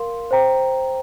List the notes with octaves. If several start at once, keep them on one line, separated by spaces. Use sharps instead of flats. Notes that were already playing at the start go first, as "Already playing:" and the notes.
Already playing: A#4 F5 C6
C5 G5 A#5